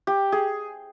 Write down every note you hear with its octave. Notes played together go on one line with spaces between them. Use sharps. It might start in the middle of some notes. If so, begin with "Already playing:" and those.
G4
G#4